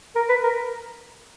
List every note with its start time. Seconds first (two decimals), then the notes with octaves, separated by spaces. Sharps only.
0.16 A#4
0.29 B4
0.43 A#4